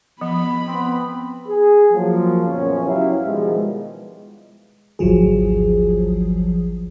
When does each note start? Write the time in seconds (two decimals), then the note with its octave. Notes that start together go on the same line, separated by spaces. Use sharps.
0.21 F3 B3 B5
0.67 B3 C4
1.48 G#4
1.93 F3 F#3 A#3
2.47 F#2 A#2 C#3 F3 B3 C#4
2.86 F#3 G3 E4 F5
3.25 B2 D#3 F3 G3 G#3
4.99 G#1 D2 F3 F#3 G#4